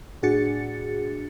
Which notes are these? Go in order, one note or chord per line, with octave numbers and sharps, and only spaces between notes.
A2 D4 F#4 G#4 A6 C#7